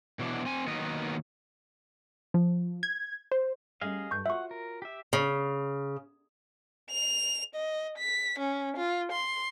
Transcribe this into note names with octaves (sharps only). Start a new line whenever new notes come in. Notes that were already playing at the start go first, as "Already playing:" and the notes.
B2 E3 F#3 D4
C4 G#5
D#3 F#3 A#3 B3 A#4 D#5
F3
G#6
C5
G3 A3 C#4 G#4 D#5 F5
G2 G3 C#6 G6
F4 F#4 C#5 E5 F#5 C#6
A#4
G4 E5
C#3
F7
D#5
B6
C#4
F4
C6